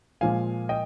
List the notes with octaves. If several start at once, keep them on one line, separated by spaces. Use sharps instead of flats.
A#2 F3 G#3 F5 G#5
D#5 G5